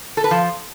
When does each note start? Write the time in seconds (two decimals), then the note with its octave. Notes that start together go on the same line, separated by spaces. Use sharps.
0.17 A4
0.24 B4
0.31 F3